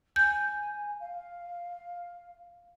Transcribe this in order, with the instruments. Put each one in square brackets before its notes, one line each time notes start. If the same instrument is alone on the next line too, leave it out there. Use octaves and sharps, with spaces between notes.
[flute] G#5 [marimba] G6
[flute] F5